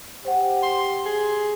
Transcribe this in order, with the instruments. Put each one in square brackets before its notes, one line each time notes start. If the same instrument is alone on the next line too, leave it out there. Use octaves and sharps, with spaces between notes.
[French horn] G4 [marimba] C5 F#5
[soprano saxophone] C6
G#4